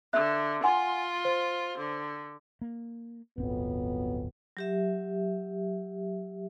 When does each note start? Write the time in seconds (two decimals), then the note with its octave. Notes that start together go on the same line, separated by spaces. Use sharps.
0.13 D3 E5 F#6
0.64 F4 F#5 G#5 C6
1.25 C5
1.78 D3
2.61 A#3
3.38 D1 G1 F2 F#3 B3 C4
4.57 F#3 G4 E5